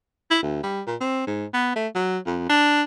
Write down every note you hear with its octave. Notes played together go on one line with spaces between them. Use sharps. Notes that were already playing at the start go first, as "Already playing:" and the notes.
E4
D2
G3
A#2
C4
G#2
B3
A3
F#3
F2
D4